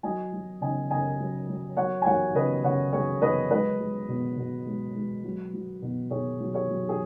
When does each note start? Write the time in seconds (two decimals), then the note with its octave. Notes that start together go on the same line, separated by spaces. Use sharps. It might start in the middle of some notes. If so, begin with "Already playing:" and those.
0.03 F#3 D#5 G#5
0.33 F#3
0.61 C#3 D#5 G#5
0.90 C#3 D#5 G#5
1.19 F#3
1.49 F#3
1.77 F#3 C#5 F#5
2.02 G#5
2.06 F#3 C#5 F#5
2.35 C#3 B4 D#5
2.64 C#3 C#5 F#5
2.93 F#3 G#4 C#5
3.22 F#3 B4 D#5
3.50 G#3 B4 D#5
3.80 G#3
4.08 B2
4.37 B2
4.66 G#3
4.95 G#3
5.24 F#3
5.53 F#3
5.82 B2
6.10 B2 G#4 C#5
6.40 F#3
6.54 G#4 C#5
6.69 F#3
6.89 G#4